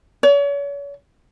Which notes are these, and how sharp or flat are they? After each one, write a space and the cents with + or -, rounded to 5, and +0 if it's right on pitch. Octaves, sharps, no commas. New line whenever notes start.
C#5 +40